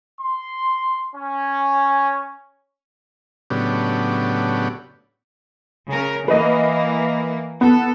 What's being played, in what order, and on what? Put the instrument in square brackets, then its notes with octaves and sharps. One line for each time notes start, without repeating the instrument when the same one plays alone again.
[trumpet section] C6
C#4
[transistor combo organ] A2 C#3 F#3 B3 D4 G4
[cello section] C#3 A#4
[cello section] E3 A#3 [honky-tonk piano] B4 D#5
[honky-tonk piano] B3 [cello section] A4